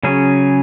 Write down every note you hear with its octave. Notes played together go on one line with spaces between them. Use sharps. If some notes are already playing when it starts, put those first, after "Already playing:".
C#3 F#3 C#4 G#4